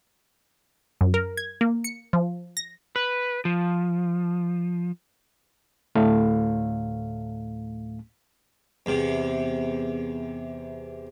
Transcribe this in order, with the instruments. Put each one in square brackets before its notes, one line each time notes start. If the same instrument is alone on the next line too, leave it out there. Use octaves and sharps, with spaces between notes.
[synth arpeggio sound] F#2
A#4
G#6
A#3
C#7
F3
A#6
[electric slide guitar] B4
F3
[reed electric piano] D2 A2 A3 F5
[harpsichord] E2 C3